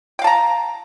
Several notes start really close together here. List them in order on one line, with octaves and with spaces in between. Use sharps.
G5 F5 A5 A#5